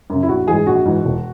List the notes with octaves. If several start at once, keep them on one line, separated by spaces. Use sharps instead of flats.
F#2 C#3
E4
A#1 F#4
G#2 E3 G#4
A#1 F#4
G#2 E3
E1